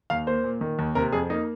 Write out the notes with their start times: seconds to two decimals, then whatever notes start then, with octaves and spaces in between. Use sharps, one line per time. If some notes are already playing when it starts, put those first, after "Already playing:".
0.10 D#2 F5
0.27 A#3 C5
0.44 A#2
0.61 D#3
0.79 D#2
0.95 C3 A#4
1.12 F2 G#4
1.30 A#3 D#4